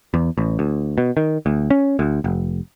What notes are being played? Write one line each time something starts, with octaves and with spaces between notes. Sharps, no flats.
E2
A1
D2
B2
D#3
D2
C#4
D2
F1